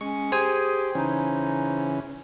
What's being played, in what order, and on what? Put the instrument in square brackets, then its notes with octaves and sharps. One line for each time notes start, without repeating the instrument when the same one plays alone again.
[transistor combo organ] G#3 C#6 [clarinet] C#4
[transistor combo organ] G4 [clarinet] G#4 [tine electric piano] C5 G#5
[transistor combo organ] C#3 E3 C#4 [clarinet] D#4